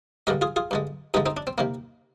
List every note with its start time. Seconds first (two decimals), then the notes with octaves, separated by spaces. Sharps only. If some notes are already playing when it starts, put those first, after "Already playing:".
0.27 G2 D3 G#3 G4 A#4
0.41 F4 G#4
0.56 F4 G#4
0.71 G2 D3 G#3
1.14 G2 D3 G#3 D#4 G4
1.26 C4 D#4
1.37 D4
1.47 C4
1.58 C3 D#3 A#3